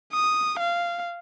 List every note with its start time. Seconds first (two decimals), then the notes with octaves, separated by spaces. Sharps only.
0.13 D#6
0.60 F5